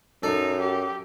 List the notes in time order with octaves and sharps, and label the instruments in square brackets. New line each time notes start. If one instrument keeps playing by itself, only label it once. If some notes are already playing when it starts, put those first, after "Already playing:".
[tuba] F#2 [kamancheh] D#4 [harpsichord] A4 D5
[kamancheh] G4